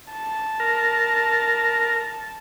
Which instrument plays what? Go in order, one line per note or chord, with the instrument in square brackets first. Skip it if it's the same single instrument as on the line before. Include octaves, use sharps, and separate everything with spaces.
[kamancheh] A5
[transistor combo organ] A#4